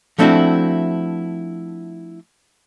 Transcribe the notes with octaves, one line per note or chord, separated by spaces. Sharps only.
F3 A3 C4 D4 E4 F#4